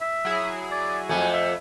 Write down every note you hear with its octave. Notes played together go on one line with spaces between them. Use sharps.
E5
F#3 E4 G#4
D5
F2 A3 G#5
E5